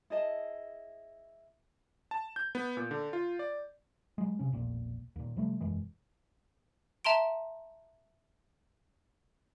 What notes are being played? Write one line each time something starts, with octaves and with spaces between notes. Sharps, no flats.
E4 G#4 D#5 A5
A5
G6
B3
A#2
D3
F4
D5
F#3 G#3
C3 C#4
E1 A#1 A#2
D#2 A#2
C3 F3 G3 A3
E1 F#2 E3 G#3
E5 A5 A#5 C6 D7